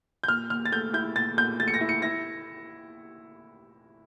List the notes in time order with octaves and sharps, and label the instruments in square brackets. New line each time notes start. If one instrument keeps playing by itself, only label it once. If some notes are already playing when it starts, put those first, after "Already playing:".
[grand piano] G6
A#2 F6
A#2 F6
A6
A3 G6
E4 G6
A#2 A6
A#2 G6
A3 A6
C#7
A#6
E4
C#7
E4 A#6